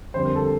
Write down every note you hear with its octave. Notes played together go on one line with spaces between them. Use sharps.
F2 D3 G3 C5
A#4
A4